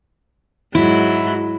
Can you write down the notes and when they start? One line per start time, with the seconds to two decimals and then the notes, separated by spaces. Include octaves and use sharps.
0.75 G#2 F#3 E4